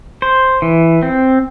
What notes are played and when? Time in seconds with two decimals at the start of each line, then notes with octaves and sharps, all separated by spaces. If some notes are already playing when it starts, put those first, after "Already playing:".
0.22 C5
0.62 E3
1.03 C4